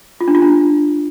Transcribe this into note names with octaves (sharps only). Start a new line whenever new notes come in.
F4
D4
F4
D4